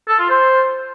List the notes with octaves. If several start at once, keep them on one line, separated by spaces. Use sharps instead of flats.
A4
F4
C5